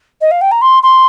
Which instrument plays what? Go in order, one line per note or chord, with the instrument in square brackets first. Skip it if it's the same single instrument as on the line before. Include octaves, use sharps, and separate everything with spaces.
[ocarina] D#5
F5
G5
A#5
C6
C6